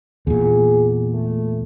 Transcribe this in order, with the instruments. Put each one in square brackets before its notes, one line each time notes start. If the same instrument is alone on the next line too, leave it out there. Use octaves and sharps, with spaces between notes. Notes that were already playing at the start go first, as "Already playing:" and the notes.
[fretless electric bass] E2 A#2 [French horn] G#4
[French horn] A3